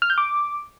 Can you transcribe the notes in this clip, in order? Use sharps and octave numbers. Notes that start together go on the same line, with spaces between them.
F6
G6
D6